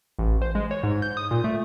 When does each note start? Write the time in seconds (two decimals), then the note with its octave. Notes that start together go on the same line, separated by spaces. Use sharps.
0.19 A1
0.42 C5
0.55 G#3
0.71 C#5
0.83 G#2
1.02 G6
1.17 D#6
1.31 A#2
1.44 A3